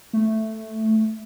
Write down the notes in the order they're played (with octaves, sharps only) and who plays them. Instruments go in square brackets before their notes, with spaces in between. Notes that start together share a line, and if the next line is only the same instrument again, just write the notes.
[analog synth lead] A3